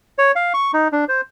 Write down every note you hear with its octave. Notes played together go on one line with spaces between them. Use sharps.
C#5
F5
C#6
D#4
D4
C5